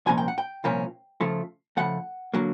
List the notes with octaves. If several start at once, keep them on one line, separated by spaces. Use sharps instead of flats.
C2 A#2 F3 A#3 C#4 G#5
G5
F#5
G5
C2 A#2 F3 A#3 C#4
C#3 F3 A3
C#3 F3 A3 F#5
D3 F#3 A#3